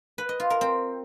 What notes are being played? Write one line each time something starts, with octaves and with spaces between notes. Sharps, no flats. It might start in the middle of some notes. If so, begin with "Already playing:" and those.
B4
D#5
F4
A#4
C4